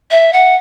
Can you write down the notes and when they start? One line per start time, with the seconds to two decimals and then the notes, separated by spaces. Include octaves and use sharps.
0.11 E5
0.33 F#5